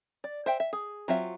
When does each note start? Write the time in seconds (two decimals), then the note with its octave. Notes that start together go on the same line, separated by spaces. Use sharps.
0.24 D5
0.46 C5 E5 G5
0.60 E5
0.73 G#4
1.08 F#3 C4 F4 E5